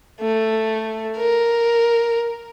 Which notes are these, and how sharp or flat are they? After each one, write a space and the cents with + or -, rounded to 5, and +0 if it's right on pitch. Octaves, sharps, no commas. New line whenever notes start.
A3 +5
A#4 +0